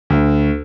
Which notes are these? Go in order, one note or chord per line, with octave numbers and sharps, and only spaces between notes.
D2